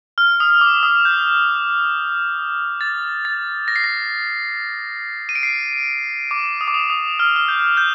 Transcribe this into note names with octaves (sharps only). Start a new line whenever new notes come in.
F6
D#6
D6
D#6
G6
A6
A6
A#6
C7
A#6
D#7
D7
C7
D6
D#6
D6
D#6
D#6
F6
F6
G6
G6